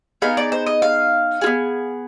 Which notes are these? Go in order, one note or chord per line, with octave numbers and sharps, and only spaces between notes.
B3 D#4 G#4 F5
D5
C5
D#5
F5
B3 F4 G#4